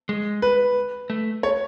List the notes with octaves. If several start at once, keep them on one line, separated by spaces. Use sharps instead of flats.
G#3
B4
A3
C#5